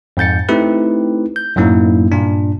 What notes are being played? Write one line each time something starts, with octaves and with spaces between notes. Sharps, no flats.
F2 G#2 G6 A6 C#7
A3 C4 D#4 E4 G4 B4
G6
F#2 A2 F#3 A#3 D#4 E4
G2 A#2 D4